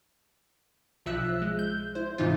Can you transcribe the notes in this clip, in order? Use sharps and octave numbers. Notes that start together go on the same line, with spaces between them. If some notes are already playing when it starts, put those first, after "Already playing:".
B1 F3 E5 E6 F#6
G#3
G6
E4 C5
G#2 C3 E3 D#4 F4